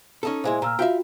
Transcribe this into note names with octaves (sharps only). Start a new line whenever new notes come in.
C#4 D#4 A4
A#2 G#3 E4 C5 G#5 C6
A#2 A#5 E6 F6
F4 F#4 E5 F5 G5